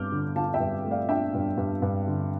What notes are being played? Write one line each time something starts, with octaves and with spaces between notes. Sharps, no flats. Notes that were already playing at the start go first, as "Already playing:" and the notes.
Already playing: G2 D4 D6 F6 G6
D3
D3 F5 A5
E5 G5
G2
A3
D5 F5
D4 E5 G5
G2
G2
G2
D3